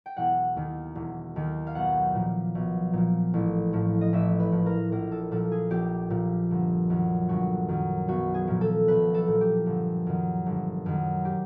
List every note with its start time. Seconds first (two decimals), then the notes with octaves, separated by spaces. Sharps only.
0.06 G5
0.16 E1 F#5
0.56 D#2 D#3
0.95 E1
1.36 D#2 D#3
1.67 F5
1.75 B1 F#5
2.15 A#2 F3
2.55 B1
2.93 A#2 F3
3.34 A1
3.73 A2 F3
4.01 D#5
4.13 A1 E5
4.39 B4
4.52 A2 F3
4.66 A#4
4.92 A#1 A#4
5.11 A4
5.31 A#2 F3 A4
5.52 G#4
5.70 A#1 G4
6.10 A#2 F3
6.51 G1
6.90 F#2 D#3
7.29 G1 F#4
7.68 F#2 D#3
8.08 B1 F#4
8.34 G#4
8.48 A#2 F3
8.61 A4
8.88 B1 B4
9.14 A4
9.28 A#2 F3
9.41 G4
9.66 G1
10.06 F#2 D#3
10.46 G1
10.86 F#2 D#3
11.25 G4